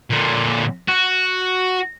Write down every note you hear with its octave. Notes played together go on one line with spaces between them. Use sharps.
A#2 D3
F#4